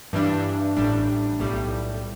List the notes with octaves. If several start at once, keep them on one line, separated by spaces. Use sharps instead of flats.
G2 E3 G3 D4
A1 A2 G3 D4
B1 A2 G3